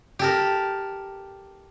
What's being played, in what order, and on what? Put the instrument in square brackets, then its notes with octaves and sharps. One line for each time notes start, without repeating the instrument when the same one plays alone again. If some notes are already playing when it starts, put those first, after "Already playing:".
[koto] G4 A4 A#4